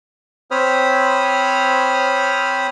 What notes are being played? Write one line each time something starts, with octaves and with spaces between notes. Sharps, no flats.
C4 C5 C#5 B5 D#6 F6